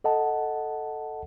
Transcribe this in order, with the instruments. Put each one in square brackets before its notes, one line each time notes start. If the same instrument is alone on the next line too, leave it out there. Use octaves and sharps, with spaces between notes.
[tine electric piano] A4 D#5 F#5 A5